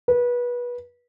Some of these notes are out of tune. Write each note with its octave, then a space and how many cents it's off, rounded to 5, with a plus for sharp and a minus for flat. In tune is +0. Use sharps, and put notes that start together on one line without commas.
B4 -25